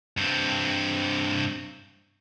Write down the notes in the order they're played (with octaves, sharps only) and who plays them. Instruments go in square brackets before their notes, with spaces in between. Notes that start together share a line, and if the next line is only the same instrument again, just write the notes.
[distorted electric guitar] G2 C4